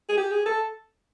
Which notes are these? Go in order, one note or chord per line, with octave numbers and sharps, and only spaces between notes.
G#4
G4
G#4
A4